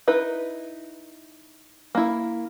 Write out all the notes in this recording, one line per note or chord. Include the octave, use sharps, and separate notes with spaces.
D#4 E4 B4
A#3 E4